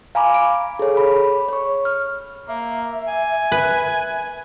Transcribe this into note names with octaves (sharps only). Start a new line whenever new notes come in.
F5 G#5 A#5 B5 D6
D7
G#4 A4 C#5
B5
C#5 C#6
F6
A#3 E5
G#5
B4